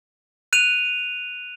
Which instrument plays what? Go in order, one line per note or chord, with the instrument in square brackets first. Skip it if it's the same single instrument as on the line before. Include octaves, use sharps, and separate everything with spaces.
[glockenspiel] F#6 D#7 F7